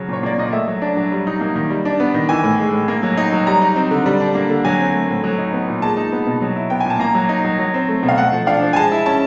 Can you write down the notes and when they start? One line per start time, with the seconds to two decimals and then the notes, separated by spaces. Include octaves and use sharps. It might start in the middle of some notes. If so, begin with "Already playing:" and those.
Already playing: C#3 F#3
0.08 A#2 C#5
0.23 A#3 D5
0.38 A#2 D#5
0.53 A3 E5
0.68 F#3
0.82 D4
0.97 F#3
1.12 G3
1.27 D#4
1.41 A#3
1.56 D#3
1.70 G3
1.85 D4
2.00 B3
2.14 D#3
2.29 E3 G#5
2.44 A2
2.59 G#3
2.73 A2
2.88 A#3
3.03 F#3
3.17 D#4
3.32 F#3
3.47 G3 A#5
3.62 D#4
3.76 C4
3.91 D3
4.06 G3
4.20 D4
4.35 A#3
4.50 D3
4.65 F#3 G#5
4.79 C4
4.94 A3
5.09 A2
5.24 F#3
5.38 D#4
5.53 B3
5.68 A#2
5.82 G#3 A5
5.97 D#4
6.12 B3
6.27 B2
6.42 F#3
6.56 E4
6.70 B3 G5
6.80 G#5
6.86 A#2 A5
7.00 A#3 A#5
7.15 F#3
7.29 D#4
7.45 F#3
7.59 F#3
7.74 C4
7.89 A3
8.03 B2
8.09 F5
8.18 A3 F#5
8.33 F3
8.47 D4 F5
8.62 F3
8.73 G#5
8.76 G#3 A5
8.92 E4
9.06 C#4 A5